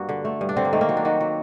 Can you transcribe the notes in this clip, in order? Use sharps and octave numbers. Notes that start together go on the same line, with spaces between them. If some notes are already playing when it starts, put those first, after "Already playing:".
Already playing: G2 A#3 F#4
D3
A3
G2
D4
D3 C4
A#3
D#3 A3
A#3
F#3 C4
D4
D#3 F#4
F#3